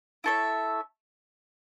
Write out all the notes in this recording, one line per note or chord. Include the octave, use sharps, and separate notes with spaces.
E4 A4 C#5 E5